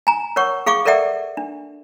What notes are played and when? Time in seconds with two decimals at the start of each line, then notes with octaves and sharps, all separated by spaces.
0.07 G#5 A#5
0.36 A#4 C#5 F#5 C#6
0.66 G#4 F5 G5 C#6 D6
0.85 A4 A#4 D5 E5 F#5 G5
1.37 D4